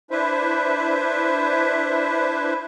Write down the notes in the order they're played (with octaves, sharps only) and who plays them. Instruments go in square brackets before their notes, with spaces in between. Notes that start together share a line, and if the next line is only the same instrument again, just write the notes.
[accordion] D4 E4 B4 C5 E5